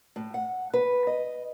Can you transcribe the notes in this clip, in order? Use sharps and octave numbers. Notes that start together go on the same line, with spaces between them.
A2
F#5
B4
D#5